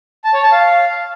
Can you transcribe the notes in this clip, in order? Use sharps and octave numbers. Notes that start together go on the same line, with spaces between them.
A5
C#5
A5
F5